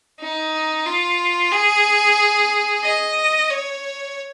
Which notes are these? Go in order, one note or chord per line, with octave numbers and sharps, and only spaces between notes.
D#4
F4
G#4
D#5
C#5